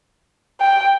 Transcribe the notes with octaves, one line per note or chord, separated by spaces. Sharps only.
G5